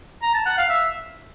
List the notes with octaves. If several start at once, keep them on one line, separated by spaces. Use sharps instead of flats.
A#5
A5
F#5
F5
E5